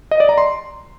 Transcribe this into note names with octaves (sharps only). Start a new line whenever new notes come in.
D#5
D5
A#5
C6